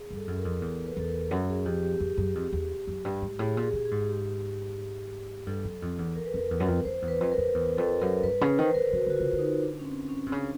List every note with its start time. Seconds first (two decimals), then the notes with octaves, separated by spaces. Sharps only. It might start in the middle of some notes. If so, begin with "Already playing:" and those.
Already playing: G#4
0.11 G2
0.16 A4
0.28 F#2
0.39 A#4
0.45 F2
0.62 E2
0.86 B4
0.97 E2 A4
1.08 A#4
1.31 F#2
1.49 G#4
1.65 F2 G4
1.83 G4
2.00 F2
2.17 F#2
2.35 F2
2.53 E2
2.87 F#2
3.05 G2
3.22 G#2
3.39 A2 G#4
3.57 A#2
3.63 G#4
3.73 A#2
3.86 G#4
3.91 G#2
4.08 G4
5.47 G2 A4
5.64 F#2
5.82 F2
5.99 E2
6.15 A#4
6.26 B4
6.34 F2 A#4
6.51 E2
6.60 F#2
6.68 F2
6.85 F2 C5
7.02 E2
7.08 B4
7.21 F2 B4
7.32 A#4
7.38 F2
7.54 E2
7.77 F2 A4
8.01 F#2 A#4
8.23 G2 B4
8.41 C#3
8.58 D#3 C5
8.66 B4
8.75 D#3 A#4
8.82 B4
8.93 D#3 F#4
9.07 D3 F#4
9.16 C#3 F4
9.33 D3
9.39 D#4
9.63 D4
9.79 C#4
9.85 C4
10.09 C#4
10.26 C3
10.32 C#3 D4